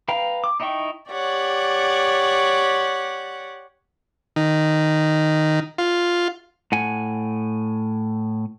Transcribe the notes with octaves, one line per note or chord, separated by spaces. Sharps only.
B4 F5 G5 A#5
D6
D#4 E4 D#5 G5 C#6
G4 C#5 D5 F#5
D#3
F4
A2 F#5 G#5